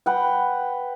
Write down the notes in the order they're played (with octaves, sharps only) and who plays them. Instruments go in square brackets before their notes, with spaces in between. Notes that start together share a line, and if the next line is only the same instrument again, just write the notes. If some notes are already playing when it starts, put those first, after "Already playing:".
[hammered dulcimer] B4 F#5 G5